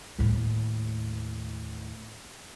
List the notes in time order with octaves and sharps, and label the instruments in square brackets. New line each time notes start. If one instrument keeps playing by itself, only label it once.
[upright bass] D#2 A2